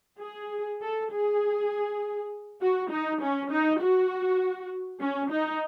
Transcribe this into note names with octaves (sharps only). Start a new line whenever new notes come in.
G#4
A4
G#4
F#4
D#4
C#4
D#4
F#4
C#4
D#4